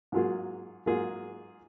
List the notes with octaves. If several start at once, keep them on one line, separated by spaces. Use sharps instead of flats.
G#2 F#3 A#3 F4 G#4
G#2 F#3 A#3 F4 G#4